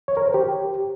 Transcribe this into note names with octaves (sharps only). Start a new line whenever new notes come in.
C#5
A#4
C5
G4